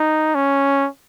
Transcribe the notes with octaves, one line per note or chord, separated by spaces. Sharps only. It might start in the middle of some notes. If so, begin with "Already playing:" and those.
Already playing: D#4
C#4